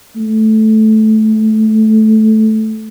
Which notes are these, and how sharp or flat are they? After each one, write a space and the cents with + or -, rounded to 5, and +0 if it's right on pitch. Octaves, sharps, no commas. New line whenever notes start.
A3 -15